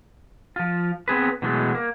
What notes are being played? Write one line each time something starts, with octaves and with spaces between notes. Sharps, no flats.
F3 F4
B3 C4 G#4 B4
B2 E3 F#3 G#3 A3
A#3